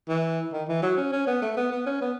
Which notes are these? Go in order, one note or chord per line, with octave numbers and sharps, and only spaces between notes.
E3
D#3
E3
F#3
C#4
C#4
B3
A3
B3
B3
C#4
B3